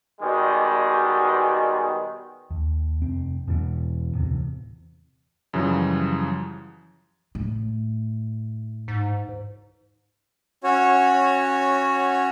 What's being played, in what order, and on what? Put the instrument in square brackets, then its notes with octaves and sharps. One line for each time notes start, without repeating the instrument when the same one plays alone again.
[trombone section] B2 D#3 G3 G#3
[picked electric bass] D#2
F1 C4
E2 B2 E3 B3
D1 E2 C3
[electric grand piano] F#2 C#3 E3 F3 G3
[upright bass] A2
[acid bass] G#2
[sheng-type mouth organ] C#4 F#4 C#5